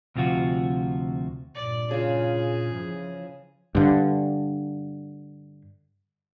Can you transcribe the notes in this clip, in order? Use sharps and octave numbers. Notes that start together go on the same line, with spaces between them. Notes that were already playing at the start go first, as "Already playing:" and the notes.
D2 C3 F3 F4 F#4
C2 G2 A#2 D5
C#3 F4 G#4
E3 F3
G2 D3